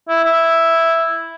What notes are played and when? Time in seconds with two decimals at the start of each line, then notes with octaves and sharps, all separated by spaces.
0.09 E4
0.24 E4